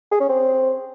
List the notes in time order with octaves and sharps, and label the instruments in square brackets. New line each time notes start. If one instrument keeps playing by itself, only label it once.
[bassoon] G#4
C#4
C4